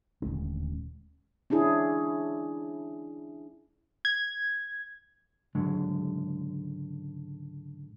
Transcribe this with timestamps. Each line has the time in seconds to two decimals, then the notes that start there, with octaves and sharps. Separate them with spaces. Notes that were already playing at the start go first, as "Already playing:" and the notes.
0.22 D#1 D2 G#3 C#4
1.50 C#4 D4 E4 G#4
4.05 G#6
5.55 C#2 G#2 D3 F#3 G#3